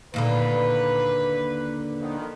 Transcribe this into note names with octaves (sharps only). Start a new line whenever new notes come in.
D#2 A#2 D3 B4
D#3 F3 B3